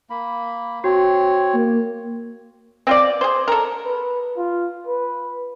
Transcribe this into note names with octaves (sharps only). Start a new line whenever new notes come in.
A#3 B5
C4 F#4 C#5
A#3
C4 F4 D5
G#4 C5
A4 A#4
B4
F4
B4